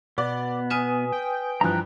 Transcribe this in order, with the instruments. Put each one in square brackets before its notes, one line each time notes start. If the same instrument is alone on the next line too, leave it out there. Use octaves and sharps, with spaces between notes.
[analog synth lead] B2 [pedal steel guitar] B3 [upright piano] D5
[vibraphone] B4 G#5 D#6 [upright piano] F6 D#7 E7
[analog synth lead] G5
[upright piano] G2 E3 F3 [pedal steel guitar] A#5 F#6